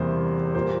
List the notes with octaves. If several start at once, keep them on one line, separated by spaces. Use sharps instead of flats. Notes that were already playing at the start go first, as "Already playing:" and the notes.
Already playing: E2 C3 E3 G3 A#3 C5
A#2 G3 A#3 C5